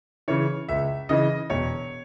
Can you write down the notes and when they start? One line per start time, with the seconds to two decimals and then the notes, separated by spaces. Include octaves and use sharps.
0.28 C#3 E3 C#5
0.69 C#2 E5
1.09 C#3 E3 D#5
1.50 E1 C#5